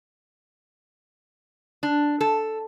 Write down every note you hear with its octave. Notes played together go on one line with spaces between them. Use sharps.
D4
A4